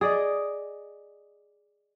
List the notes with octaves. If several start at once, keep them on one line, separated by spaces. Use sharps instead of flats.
G#4 D5 D#5